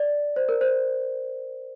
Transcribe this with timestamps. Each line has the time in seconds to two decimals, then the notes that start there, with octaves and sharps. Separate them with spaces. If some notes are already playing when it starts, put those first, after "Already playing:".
Already playing: D5
0.36 C5
0.49 A#4
0.61 C5